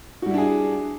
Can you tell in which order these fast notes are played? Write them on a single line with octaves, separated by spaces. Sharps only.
F#4 G3 E4 D4 G#4